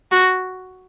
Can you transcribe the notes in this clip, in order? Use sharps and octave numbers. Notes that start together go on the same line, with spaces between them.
F#4